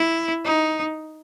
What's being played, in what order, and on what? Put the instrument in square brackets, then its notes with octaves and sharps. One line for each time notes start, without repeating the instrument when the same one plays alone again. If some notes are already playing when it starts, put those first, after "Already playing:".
Already playing: [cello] E4
D#4